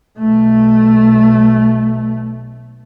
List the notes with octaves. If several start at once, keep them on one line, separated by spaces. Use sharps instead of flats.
B1 A3